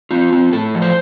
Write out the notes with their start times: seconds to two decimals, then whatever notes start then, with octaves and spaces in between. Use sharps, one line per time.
0.11 C4 F4
0.33 C4
0.52 A2 A4
0.75 F3
0.82 C5